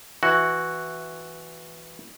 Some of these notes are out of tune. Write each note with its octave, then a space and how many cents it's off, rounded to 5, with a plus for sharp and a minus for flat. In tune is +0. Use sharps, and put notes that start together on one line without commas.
E3 +0 F#4 +0